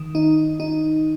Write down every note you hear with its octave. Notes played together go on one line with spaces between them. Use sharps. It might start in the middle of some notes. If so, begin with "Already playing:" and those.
Already playing: D#3
D#4
D#4